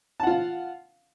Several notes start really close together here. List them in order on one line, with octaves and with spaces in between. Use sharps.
A5 F#5 F4 F5